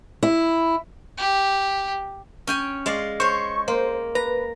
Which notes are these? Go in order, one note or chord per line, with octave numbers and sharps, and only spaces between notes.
E4
G4
C#4 G5 G#5
G#3 D5 F5
C5 C#5 C#6
A#3 C5
B4 A#5